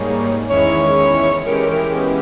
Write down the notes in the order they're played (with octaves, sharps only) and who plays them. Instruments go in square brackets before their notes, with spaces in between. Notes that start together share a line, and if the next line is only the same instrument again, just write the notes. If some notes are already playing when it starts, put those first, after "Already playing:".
Already playing: [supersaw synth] G#2 G3 A#3 D#4 G#4 [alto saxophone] C#5
[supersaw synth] E2 D#3 G#3 C#4 E4 [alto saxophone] C#5
[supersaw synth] E3 G#3 C#4 G4 [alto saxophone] A#4
[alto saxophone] A#4
B3